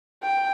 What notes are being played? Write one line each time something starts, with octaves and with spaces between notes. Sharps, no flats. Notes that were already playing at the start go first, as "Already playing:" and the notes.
G5